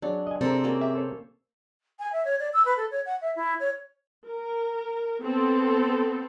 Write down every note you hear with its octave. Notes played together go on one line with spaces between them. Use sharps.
F#3 G#3 D4 C#5
D#5 G#5
C3 G#3 A#3 C4 A4 A#5
A#3 C#4 F#4
G4 E5
A4 C5 C#5
G#5
E5
C#5
D5
E6
B4
A4
C#5
F#5
E5
E4
C#5
A#4
B3 C4 A4